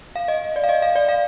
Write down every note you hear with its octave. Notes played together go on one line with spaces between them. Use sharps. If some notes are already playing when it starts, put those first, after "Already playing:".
F5
D#5
D5
F5
D#5
F5
D5
F5